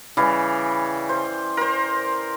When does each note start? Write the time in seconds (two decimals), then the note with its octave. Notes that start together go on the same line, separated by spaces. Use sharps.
0.17 C#3 E3 G3
1.09 C5
1.57 A#4 C5